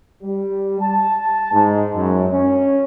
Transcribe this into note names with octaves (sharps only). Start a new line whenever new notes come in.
G3
A5
G#2
F#2
C#4